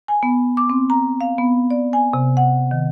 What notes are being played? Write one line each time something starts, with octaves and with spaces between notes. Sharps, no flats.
G#5
B3
D6
C4
A#5
F5
B3
D5
G#5
C3
F#5
D#3